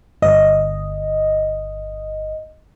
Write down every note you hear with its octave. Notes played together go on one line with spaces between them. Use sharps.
G1 D#5